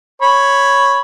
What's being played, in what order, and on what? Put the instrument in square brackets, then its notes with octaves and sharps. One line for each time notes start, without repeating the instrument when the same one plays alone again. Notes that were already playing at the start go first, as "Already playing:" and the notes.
[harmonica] C#5 B5